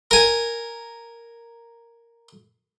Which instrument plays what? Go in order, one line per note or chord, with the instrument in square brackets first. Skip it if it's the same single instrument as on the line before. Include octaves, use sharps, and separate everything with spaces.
[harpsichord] A#4 G#5